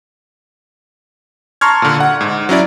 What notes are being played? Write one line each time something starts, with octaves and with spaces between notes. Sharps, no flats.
A5 A#5 C6 C#6 F6 G#6
A#2 D3
F#5
G#2
F#3 C#4 E4 D5